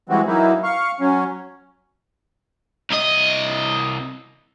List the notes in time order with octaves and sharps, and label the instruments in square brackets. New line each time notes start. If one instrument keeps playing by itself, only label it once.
[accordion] E3 G3 G#3 C4 F#4
E3 F#3 A#3 D#4 E4
F5 C#6
F#3 C#4
[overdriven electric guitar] C2 D#5